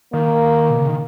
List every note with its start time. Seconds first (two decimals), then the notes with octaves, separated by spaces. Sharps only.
0.13 D#3 A#3
0.70 B2
0.79 C#3
0.87 D#3